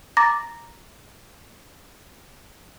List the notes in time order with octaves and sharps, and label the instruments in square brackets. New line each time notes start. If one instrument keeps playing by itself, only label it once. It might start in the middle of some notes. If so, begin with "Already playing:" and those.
[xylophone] A#5 D6 A6 A#6